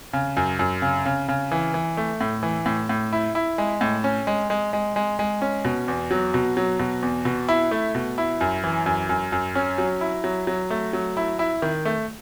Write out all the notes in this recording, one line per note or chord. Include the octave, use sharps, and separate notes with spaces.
C#3
F#2
F#2
C#3
C#3
C#3
E3
E3
A3
A2
E3
A2
A2
E4
E4
G#3
A2
C#4
G#3
G#3
G#3
G#3
G#3
C#4
B2
E2
F#3
B2
F#3
B2
E2
B2
E4
A3
B2
E4
F#2
E3
F#2
F#2
F#2
C#4
F#3
E4
F#3
F#3
A3
F#3
E4
E4
D#3
A3